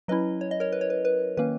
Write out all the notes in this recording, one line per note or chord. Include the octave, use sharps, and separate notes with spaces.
F#3 C#4 E4 B4 D#5
C#5
D#5
A#4 C#5
B4
C#5
B4
B4
D#3 A#3 C#4 B4